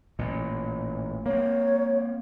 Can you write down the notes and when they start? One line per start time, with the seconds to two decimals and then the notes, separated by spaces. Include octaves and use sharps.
0.19 A1 A#2
1.26 A#3 C4 C#5